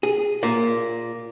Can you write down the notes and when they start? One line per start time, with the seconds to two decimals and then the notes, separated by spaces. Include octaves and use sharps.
0.03 G#4
0.43 A#2